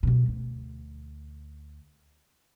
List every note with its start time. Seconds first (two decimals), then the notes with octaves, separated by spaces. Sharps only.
0.03 B2 G3
0.28 D2